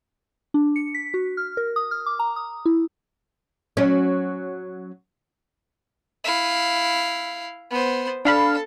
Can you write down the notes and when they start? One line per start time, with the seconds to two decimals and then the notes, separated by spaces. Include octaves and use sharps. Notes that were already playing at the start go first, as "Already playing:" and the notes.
0.54 D4
0.76 C#7
0.94 B6
1.14 F#4
1.37 F6
1.57 A#4
1.76 D#6
1.91 F6
2.06 D6
2.19 A#5
2.36 D#6
2.66 E4
3.77 F#3 C#4
6.24 E4 F5
7.71 B3 C5
8.25 D4 A4 F5 B5